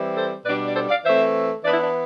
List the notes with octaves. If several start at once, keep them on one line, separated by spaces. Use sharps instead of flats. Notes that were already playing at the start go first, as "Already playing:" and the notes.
Already playing: E3 G3 C4
A4 C5
B2 G3 D4 B4 D5
D5
A4 C5
D5 F5
E3 A3 C4 C5 E5
E3 B3 D4 B4 D5
E4
D4